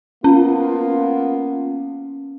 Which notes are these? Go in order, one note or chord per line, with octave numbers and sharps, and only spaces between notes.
A#3 B3 C#4 F4